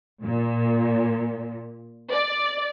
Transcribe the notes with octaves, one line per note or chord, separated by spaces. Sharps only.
A#2
D5